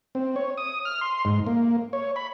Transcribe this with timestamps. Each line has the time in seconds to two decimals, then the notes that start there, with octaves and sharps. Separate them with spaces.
0.15 C4
0.36 C#5
0.57 D#6
0.85 F6
1.01 C6
1.25 G#2
1.47 A#3
1.93 C#5
2.16 B5